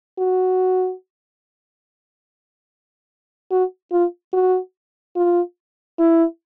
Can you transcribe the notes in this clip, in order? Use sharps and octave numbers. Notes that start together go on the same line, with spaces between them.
F#4
F#4
F4
F#4
F4
E4